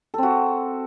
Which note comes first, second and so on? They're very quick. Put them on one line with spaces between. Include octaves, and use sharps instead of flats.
A4 C4 F#4